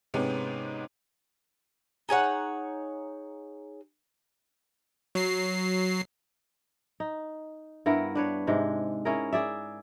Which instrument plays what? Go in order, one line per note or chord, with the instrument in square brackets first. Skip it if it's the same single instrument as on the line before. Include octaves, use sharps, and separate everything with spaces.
[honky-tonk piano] G#2 C3 G#3 B3 C#4
[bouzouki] D#4 G#4 C#5 F#5
[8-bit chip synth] F#3 C7
[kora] D#4
G2 B3 E4 A#4
D4 B4 C#5
G#2 C3 G#3
C#4 E4 G#4 A#4
G#4 D5 E5